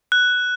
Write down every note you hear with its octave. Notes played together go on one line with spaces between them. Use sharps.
F#6